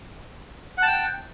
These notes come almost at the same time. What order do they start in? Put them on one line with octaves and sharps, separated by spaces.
F#5 A5 G5